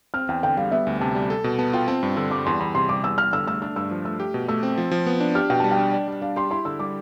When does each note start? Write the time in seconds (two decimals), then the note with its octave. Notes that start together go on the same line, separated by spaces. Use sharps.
0.14 C4 F6
0.29 E2 G5
0.43 D3 G5
0.57 G3 F5
0.72 B3 E5
0.87 D2
1.01 C3 A5
1.15 G3
1.30 A4
1.44 B2
1.59 B3 A5
1.73 F4 G5
1.88 C4 A5
2.03 G2
2.17 D3 E6
2.31 G3 D6
2.46 E2 C6
2.60 E2 B5
2.75 C3 C6
2.89 G3 D6
3.03 E2 E6
3.18 E2 F6
3.33 D3 E6
3.47 A3 E6
3.62 D4 E6
3.76 G2 E6
3.91 F3
4.05 A3 E6
4.20 G4
4.34 B2
4.48 A3 E6
4.63 C4
4.78 F3
4.91 F3
5.06 B3
5.20 D4
5.35 G4 F6
5.50 B2 G5
5.60 G3 A5
5.71 G5
5.79 D4
5.93 D5
6.08 G3
6.22 D4 F5
6.36 G4 C6
6.51 E4 C6
6.65 D3 E6
6.79 G3 D6